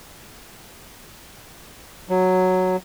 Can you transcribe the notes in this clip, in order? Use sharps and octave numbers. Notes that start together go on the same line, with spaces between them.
F#3